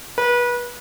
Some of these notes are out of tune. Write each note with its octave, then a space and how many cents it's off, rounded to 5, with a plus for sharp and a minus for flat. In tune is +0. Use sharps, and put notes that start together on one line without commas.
B4 -30